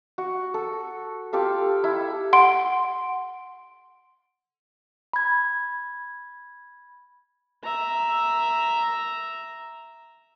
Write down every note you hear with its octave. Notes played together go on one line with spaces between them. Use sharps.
F#4
A4
F4 G4 A4 F5
E4
F#5 C6 D7
B5 G#6
E5 A#5